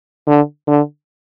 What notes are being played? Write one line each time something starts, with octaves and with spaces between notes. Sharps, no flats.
D3
D3